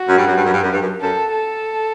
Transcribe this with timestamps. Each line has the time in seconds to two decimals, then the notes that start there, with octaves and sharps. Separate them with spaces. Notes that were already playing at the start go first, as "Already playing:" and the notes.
Already playing: F#4
0.09 F#2
0.17 G2
0.26 F#2
0.36 G2
0.45 F#2
0.53 G2
0.63 F#2
0.72 G2
0.81 F#2
1.01 F#2 A4
1.31 A4